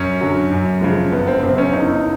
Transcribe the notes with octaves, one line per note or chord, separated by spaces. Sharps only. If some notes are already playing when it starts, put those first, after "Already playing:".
Already playing: F#2 C#4
D3 F#3
F#2
C#3 F3 G#3
G1 B3
C4
F#2 C#3 C4
C#4
G1 D#4
E4
D#4